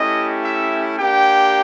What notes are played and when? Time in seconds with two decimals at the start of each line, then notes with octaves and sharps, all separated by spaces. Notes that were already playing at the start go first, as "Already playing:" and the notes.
Already playing: A3 C#4 E4 G4 D#5
0.45 E5
0.99 A#3 D4 G4 G5